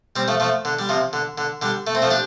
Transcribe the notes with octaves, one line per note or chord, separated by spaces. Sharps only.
G3 C4
F3 A3
F3 A3
D3
G3
C3 F3
D3
D3
D3 G3
A3
C4
F3 A3
D4 G4